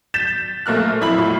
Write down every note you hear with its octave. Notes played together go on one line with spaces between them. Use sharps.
G6 A6 B6 E7
A#1 A3 A#3 F6 F#6
F2 E4 B5 F#7
A2 F4